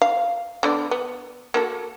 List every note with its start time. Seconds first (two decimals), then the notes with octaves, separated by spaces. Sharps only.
0.02 F5
0.63 D3 B3 D5
0.91 B3
1.54 A#3 F#4 A4